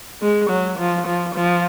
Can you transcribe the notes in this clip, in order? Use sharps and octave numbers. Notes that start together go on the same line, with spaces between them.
G#3
F#3
F3
F3
F3